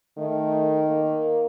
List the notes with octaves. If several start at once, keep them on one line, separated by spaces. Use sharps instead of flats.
D#3 A3
A#3